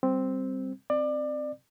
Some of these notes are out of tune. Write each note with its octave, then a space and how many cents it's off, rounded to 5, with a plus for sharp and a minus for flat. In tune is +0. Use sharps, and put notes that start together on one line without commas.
G3 +0 C4 +0
C4 +0 D5 +25